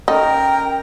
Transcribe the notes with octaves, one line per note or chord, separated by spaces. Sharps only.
C#4 D#4 A4 A#4 D#5 G5